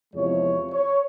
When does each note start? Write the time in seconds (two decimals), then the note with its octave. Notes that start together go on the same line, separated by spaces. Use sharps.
0.14 E2 C3 F3 G#3 C#5
0.71 C#5